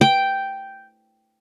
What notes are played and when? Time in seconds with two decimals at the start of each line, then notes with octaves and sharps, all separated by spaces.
0.01 G5